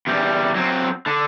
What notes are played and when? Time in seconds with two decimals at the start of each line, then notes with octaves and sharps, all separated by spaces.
0.07 E2 G3
0.55 F#3 C4
1.07 D3